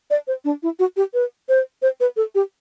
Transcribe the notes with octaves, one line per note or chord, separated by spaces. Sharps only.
D5
C5
D4
E4
F#4
G4
B4
C5
C5
B4
A4
G4